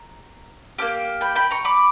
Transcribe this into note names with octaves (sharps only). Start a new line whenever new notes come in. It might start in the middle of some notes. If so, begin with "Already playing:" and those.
Already playing: A#5
A#3 C#4 G4
G5 B5
G5 B5
A#5 C#6
B5 D6